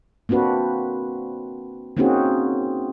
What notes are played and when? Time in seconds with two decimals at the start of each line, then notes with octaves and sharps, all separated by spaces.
0.29 A#3 C4 D4 F#4 B4
1.97 A#3 C4 C#4 D#4 F#4 G#4